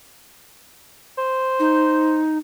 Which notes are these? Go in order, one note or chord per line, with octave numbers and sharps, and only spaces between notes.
C5
D#4